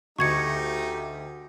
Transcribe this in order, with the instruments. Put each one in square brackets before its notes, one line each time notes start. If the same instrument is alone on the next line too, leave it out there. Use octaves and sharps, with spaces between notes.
[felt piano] D2 [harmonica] A3 D#4 G4 [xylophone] C#6 G#6 C#7